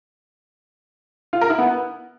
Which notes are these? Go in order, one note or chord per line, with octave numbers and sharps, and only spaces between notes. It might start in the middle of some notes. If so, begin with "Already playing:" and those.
F4
A#4
E4
B3